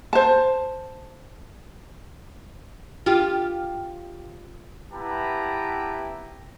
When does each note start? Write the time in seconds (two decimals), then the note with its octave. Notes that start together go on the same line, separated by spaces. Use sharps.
0.13 C5 A5
3.06 F4 G4
4.93 B3 E4 G4 B4 A5 A#5